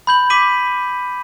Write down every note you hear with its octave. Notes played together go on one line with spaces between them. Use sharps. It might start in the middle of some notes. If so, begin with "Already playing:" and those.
B5 G6 F#7
D6 B6 D#7 F#7